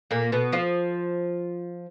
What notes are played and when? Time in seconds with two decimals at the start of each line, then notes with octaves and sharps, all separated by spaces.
0.11 A#2 A#3
0.32 B2 B3
0.53 F3 F4